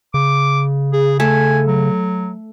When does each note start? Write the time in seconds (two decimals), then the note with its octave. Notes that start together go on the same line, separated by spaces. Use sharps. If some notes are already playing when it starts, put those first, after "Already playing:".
0.14 C#3 D6
0.93 G#4
1.20 A3 G#5
1.67 F#3